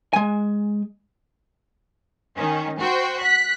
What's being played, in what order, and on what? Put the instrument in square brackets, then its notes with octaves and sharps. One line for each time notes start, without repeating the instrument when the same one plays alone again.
[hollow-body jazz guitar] G#3 G#5
[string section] D#3 C#4
F#4 C5 G5
F#6 B6